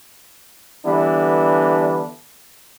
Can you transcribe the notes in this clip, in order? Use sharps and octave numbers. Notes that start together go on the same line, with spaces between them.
D3 E3 G3 B3 D4